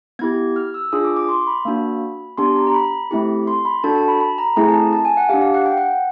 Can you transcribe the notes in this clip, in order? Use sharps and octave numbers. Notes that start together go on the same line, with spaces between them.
B3 E4 G4 G#6
F6
E6
D4 F4 G#4 D#6
D6
D6
C6
B5
A#3 D4 F#4
B3 D4 G4 C6
A#5
A#5
B5
A3 C4 E4 G4
C6
B5
D4 F#4 A4 A5
A5
B5
B5
A#5
A3 C4 E4 G#4 A#5
A5
A5
G#5
F#5
D4 G4 F5
F5
F#5
G5
F#5